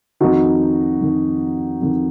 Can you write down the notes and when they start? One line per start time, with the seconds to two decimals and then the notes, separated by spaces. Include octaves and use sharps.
0.20 F2 D#3 D#4 F#4
1.01 F2 D#3
1.81 F2 D#3